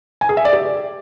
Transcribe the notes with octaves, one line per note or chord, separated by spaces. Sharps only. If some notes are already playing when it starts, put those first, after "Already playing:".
G#5
G#4
E5
D5
G4